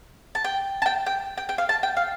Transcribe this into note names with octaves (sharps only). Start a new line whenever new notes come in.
A5
G5
A5
G5
G5
G5
G5
F5
A5
G5
F5